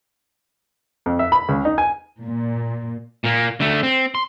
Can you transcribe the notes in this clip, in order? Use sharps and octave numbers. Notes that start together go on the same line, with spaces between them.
F2
E5
B5
C#2
D#4
G#5
A#2
A#2 A#3
D3 A3
C4
C6